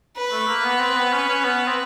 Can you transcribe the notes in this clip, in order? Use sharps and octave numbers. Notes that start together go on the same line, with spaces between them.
B4
A3
A#3
B3
C4
B3
C#4
C#4
B3
C4